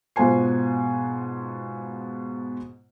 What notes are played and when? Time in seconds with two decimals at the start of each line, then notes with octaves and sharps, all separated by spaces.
0.16 G#2 B2 F4 C5 G#5 C7